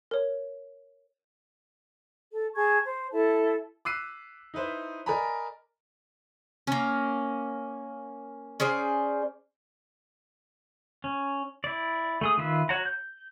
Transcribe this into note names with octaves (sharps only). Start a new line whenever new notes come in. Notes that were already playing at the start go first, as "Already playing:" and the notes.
A#4 C#5
A4
G#4 A5 C#6 G#6
C5
E4 A4 A5
D6 E6 F#6 B6 C7 D#7
D#4 E4 B4 C5
A#4 D5 D#5 G#5 A#5 B5
A#3 C#4
C#4 G#4 C5 D5
C#4
E4 D5
A3 G#4 D#6
D#3 F4 B4 E5
F#4 C#5 F#5 A#5
G6